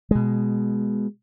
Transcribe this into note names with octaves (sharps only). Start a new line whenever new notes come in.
B2 G#3